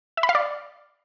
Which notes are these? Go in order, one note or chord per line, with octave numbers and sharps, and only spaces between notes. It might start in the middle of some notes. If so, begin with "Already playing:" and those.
E5
B5
F5
D5